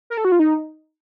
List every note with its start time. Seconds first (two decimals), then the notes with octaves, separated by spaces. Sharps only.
0.10 A#4
0.17 A4
0.25 F#4
0.32 F4
0.39 D#4